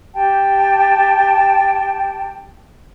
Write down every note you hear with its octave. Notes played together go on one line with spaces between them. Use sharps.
G4 G5 A5